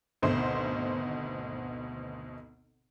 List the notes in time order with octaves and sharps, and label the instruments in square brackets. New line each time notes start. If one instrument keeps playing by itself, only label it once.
[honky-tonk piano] G#1 D2 B2 C5 C6